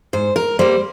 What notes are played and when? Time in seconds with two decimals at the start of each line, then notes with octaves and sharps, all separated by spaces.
0.13 G#2 C5
0.36 A#4
0.59 G3 A#3 C5